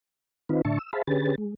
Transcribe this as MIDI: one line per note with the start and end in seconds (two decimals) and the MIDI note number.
0.49 0.61 51
0.49 0.61 60
0.49 0.61 63
0.49 0.61 65
0.49 0.61 71
0.65 0.79 45
0.65 0.79 50
0.65 0.79 62
0.65 0.79 76
0.65 0.79 81
0.65 0.79 85
0.79 0.91 88
0.93 1.02 68
0.93 1.02 72
0.93 1.02 76
0.93 1.02 77
0.93 1.02 81
0.93 1.02 83
1.07 1.35 50
1.07 1.35 61
1.07 1.35 67
1.07 1.35 68
1.07 1.35 71
1.07 1.35 93
1.38 1.55 56